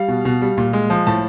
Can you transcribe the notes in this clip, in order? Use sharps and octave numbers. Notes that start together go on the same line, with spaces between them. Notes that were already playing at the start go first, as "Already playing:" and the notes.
Already playing: G3 F5
B2
B2
G3
A#2
G#3
F3
A2 A5